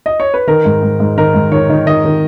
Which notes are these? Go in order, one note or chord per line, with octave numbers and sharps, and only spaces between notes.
D#5
C#5
B4
D#3 A#4
G#2
G#2
G#2
D#3 A#4
G#2
D#3 C#5
D#3
D#3 D#5
D#3